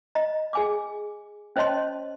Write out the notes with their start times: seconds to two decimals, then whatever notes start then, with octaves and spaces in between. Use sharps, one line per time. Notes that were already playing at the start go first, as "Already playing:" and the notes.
0.15 D#5 A#5
0.53 G#4 G#5 D6
1.56 C#4 C5 C#5 D#5 A5 C6